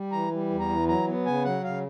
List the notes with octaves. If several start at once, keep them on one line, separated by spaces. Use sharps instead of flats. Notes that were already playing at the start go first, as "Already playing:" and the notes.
Already playing: G3
E3 A#5
G3
E2
A#5
E3
F#3 A#5
B3
C#3 G#5
F#3 F#5
C#3 F5